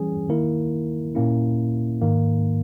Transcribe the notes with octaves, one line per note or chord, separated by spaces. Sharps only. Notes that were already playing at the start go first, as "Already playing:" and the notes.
Already playing: E3 G3 C#4 G#4
D#3 A#3 E4 A#4
A#2 A#3 C#4 E4
G#2 D#3 A#3